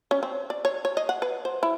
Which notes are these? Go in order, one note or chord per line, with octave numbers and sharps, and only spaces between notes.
C#4
C4
D5
C#5
C#5
D#5
F#5
B4
C5
E4